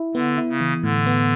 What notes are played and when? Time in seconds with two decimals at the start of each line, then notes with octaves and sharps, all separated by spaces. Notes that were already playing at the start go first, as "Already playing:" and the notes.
Already playing: E4
0.15 D3 B3
0.38 E4
0.49 C#3
0.61 E3
0.83 A2 D3
1.07 B3